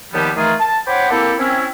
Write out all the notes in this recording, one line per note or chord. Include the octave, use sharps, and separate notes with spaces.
D#2 D#3 F3 G3 B3 G4
D#3 E3 A3 F4 G#4 A#4
A5
C5 C#5 F#5 G5 B5 D6
A#3 C4 E4 G4 A4
C4 C#4 E4